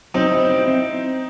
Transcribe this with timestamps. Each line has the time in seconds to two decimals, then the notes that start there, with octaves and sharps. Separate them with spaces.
0.14 F#3 C4 D#4
0.32 E4
0.49 C4
0.68 C4